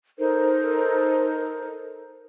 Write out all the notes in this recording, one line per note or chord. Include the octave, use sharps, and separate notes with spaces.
D#4 A4 A#4 C5